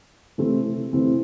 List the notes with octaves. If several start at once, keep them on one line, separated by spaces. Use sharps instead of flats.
C3 E3 A3 C4 E4
C3 E3 A3 C4 E4